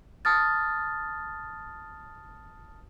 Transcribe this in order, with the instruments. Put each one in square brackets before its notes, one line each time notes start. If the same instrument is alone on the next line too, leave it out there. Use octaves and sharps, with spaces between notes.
[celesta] A5 D#6 F6 A6